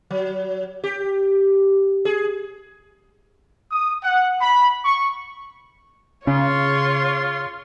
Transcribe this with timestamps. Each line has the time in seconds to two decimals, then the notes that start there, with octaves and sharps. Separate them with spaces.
0.11 F#3
0.84 G4
2.05 G#4
3.70 D#6
4.03 F#5
4.40 B5
4.82 C#6
6.27 C#3 C#4 F4 C#5 C6